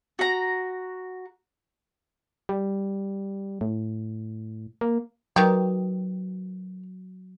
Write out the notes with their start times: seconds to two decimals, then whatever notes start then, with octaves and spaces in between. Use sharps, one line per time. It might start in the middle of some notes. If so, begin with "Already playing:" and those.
0.19 F#4 A#5
2.49 G3
3.61 A2
4.81 A#3
5.36 D#3 F#3 G4 A#4 B4 D5